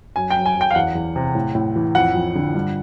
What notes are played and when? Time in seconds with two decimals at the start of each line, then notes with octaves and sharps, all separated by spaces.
0.16 F#2 G#5
0.30 G5
0.36 F#2
0.46 G#5
0.55 F#2
0.61 G5
0.71 F5
0.75 E2 F#5
0.95 E2
1.16 C3
1.35 A2
1.55 A2
1.76 E3
1.95 F2 F#5
2.15 F2
2.35 D3
2.54 G2